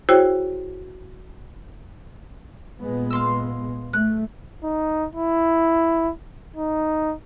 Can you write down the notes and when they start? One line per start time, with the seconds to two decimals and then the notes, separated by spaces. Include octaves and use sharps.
0.09 E4 F#4 G#4 C5 C#5 G5
2.81 A#2 G#3 B3
3.11 F5 C6 E6
3.93 A3 F#6
4.63 D#4
5.15 E4
6.56 D#4